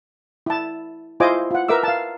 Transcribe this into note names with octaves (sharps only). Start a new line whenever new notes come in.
E4 A5
E4 F4 C5 D#5 G#5 D6
F4 F#5
A#4 B4 E5 D6 E6
F5 A5